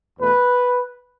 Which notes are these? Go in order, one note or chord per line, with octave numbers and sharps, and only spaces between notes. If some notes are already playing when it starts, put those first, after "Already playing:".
E2 B2 A3 B4